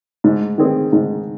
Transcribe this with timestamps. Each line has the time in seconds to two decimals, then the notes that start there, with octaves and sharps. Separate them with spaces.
0.24 G#2
0.58 D#3 C4 G#4
0.93 G#2